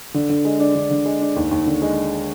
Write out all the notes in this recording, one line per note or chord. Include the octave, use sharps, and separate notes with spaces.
D3
D3
G#3
D4
D3
D3
G#3
D4
D#2
D#2
D3
G#3